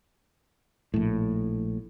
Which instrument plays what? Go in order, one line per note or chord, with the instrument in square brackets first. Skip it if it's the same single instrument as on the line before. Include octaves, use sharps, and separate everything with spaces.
[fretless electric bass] A#1 A2